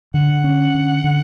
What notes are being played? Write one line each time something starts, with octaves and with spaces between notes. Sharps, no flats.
D3 F#5
C#4
D3
D3